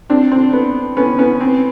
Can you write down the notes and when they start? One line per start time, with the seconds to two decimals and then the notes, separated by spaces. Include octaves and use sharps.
0.10 C4 D4
0.32 C4
0.53 B3
0.97 B3 C#4
1.18 B3 C#4
1.41 C4